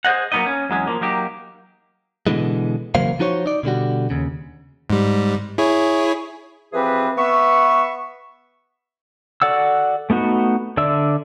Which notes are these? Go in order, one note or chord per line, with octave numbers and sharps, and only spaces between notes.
G#4 C5 C#5 D#5 F#5
F#3 A#3 B3 D#4 D#5
C#4
E2 F#3 G#3 C#4
F3 A#3
F#3 A#3 D#4 G4
B2 D3 E3 G#3
C#3 E3 F#3 A#3 C5 F5
F3 D#4 F#4 C5 C#5
D#4 D5
B2 D3 G3 F#4
D#2 C#3
G#2 G3
E4 G#4 C#5
E3 F3 C4 G4 G#4 B4
B3 E5 C#6
F#4 A4 D5 F#5 E6
A3 B3 D#4 F#4
D3 D5 E5 E6